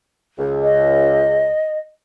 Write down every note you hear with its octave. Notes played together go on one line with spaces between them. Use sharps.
C#2
D#5